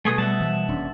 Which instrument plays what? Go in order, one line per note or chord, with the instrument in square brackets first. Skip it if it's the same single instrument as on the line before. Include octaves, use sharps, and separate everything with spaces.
[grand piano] B2 [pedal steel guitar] A3 G#4 D#6
[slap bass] G3 [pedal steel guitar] E5 F#5 A5
[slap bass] E3 G3
D#1 C#4 D4